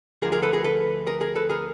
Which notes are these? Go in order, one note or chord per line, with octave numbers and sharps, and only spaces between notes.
D2 D3 F3 G#4 A#4
G#4 A#4
A4 B4
G#4 A#4
A4 B4
G#4 A#4
G#4 A#4
A4 B4
G#4 A#4